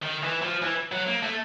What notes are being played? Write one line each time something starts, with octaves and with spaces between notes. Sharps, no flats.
D#3
E3
F3
E3
F#3
A#3
A3